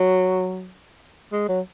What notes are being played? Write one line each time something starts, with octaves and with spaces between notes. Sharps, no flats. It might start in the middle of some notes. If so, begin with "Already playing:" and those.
Already playing: F#3
G#3
F#3